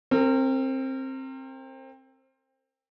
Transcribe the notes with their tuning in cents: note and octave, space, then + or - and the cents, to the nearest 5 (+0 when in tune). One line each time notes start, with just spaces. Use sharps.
C4 +20 A#4 -30